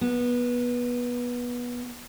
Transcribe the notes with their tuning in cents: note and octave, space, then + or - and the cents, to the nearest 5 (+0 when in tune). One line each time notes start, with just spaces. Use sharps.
B3 -20